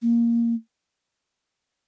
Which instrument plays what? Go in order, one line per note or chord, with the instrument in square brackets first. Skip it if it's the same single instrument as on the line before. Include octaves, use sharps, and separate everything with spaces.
[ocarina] A#3